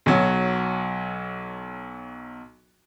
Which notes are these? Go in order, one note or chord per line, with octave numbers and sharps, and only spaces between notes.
B1 F#3 F#4